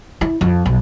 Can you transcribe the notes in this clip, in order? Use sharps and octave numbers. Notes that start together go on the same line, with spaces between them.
E4
F2
B1